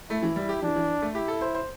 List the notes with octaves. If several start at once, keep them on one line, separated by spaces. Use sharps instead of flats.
A3 E4
E3
G3
G4
E3 D4
E3
A3
E4 G4
A4
C5
C5